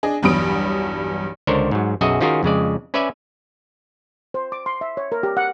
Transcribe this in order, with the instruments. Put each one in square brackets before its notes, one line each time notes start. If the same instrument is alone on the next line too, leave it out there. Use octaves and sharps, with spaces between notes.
[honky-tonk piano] D4 G#4 D#5
B1 E2 G2 B5 D#6 D7
[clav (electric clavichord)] C#2 D3 D4 A#4 C5 C#5
G#2 F#3
B1 F#2 F#4 G#4 D#5 E5
D#3 C#4 F4 F#4 G#4 A#4
F2 C#3 G#3 D5
C#4 B4 D5 E5 G#5
[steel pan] C5
D6
C6
E5
C#5
A#4
G4
F#5